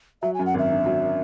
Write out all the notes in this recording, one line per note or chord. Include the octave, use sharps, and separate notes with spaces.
F#3 E5
G#5
F#2
F#5
G#1 E5
D3
F#3